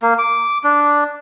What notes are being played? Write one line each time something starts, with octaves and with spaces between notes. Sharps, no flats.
A#3
D6
D4